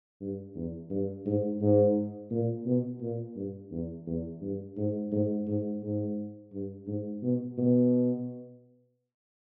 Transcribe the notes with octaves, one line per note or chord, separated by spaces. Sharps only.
G2
E2
G2
G#2
G#2
A#2
B2
A#2
G2
E2
E2
G2
G#2
G#2
G#2
G#2
G2
G#2
B2
B2